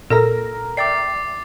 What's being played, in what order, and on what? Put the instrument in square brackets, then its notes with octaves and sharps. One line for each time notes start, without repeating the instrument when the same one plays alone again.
[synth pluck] A#2 E6 A#6 [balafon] A4 [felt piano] A#4 A#5
[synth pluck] D5 E5 G5 [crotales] D6 A6 C7